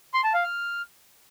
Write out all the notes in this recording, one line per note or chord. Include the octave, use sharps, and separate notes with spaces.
C6
A5
F5
F6